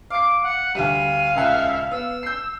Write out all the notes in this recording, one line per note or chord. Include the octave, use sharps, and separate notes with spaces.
F5 D6 C7
F#5
D2 G3 F5 D#7
D#1 C#2 E5 F#5
B3 E6
G6 C7